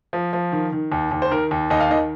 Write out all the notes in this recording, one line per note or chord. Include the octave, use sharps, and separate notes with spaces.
F3
F3
D#3
D#3
D#2
D#2
C5
D#3 A#4
D#2
D#2 D#5
F5
D#3 D#5